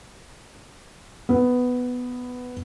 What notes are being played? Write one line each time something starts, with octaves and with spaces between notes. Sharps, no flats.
B3